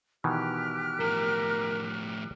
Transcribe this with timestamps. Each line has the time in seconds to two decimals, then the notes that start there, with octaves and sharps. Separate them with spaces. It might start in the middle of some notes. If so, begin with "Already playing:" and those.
0.24 B2 D#3 E3 G4 F6 F#6
1.00 A2 F3 A#4